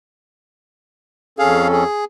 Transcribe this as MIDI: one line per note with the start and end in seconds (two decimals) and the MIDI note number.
1.39 1.84 41
1.39 1.84 61
1.39 1.68 68
1.39 1.84 69
1.39 1.68 77
1.72 2.05 68